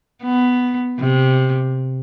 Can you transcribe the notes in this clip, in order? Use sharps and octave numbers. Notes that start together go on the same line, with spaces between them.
B3
C3